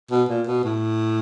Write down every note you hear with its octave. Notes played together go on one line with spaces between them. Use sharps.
B2
A#2
B2
A2